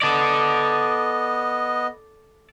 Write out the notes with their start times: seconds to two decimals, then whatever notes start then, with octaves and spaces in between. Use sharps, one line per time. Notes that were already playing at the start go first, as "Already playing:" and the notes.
0.02 B3 A4 D5 D#5